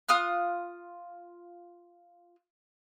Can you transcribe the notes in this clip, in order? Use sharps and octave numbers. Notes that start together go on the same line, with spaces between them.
F4 D#6 F6 F#6